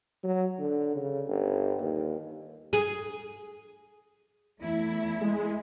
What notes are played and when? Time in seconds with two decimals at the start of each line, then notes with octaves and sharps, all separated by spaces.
0.24 F#3
0.59 D3
0.96 C#3
1.28 G1
1.80 D#2
2.73 G#4
4.60 E2 A3 E4
5.21 G#3